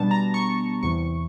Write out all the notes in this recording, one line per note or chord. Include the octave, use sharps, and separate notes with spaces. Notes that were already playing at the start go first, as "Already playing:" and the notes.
Already playing: B2 G3 B3 D4 A5
A#5
C#6
E2 C3 E3 C#6